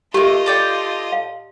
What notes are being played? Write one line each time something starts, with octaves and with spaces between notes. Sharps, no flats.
A3 A#3 F4 G4 D#5
A4 D5 G5
F5